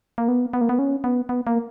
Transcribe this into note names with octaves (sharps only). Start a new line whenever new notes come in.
A#3
B3
B3
A#3
B3
C#4
B3
B3
A#3